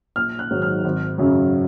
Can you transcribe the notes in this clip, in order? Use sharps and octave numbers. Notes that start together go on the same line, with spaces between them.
A#1 F6
F#6
G#2 D#3 F#3
F6
G#1
F#2 C#3 F#3